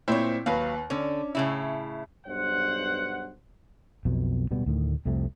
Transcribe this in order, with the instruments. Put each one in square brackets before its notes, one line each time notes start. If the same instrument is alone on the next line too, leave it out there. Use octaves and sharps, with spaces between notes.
[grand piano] A#2 C4 E4 [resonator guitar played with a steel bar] C5 C#5
[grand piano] D#2 B4 [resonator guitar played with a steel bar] F#3 F5
[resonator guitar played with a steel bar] D3 [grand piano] C#4
[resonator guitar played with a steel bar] A2 C#3 E4
[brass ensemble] B1 G2 C5 F#5
[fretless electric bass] B1 F2 B2
D1 B2 G3 B3
D2 A2 D#3
C2 F2 C3 A3